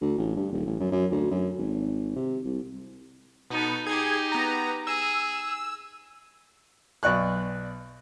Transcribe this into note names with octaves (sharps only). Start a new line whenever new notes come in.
D2
A1
G2
D#1
A1
F#2
F#2
D2
F#2
G#1
C3
C2
B2 B3 D#4 A4
D#4 G4 G#4 G#6
B3 A#5
G#4 E6
B1 D5 C#6 F#6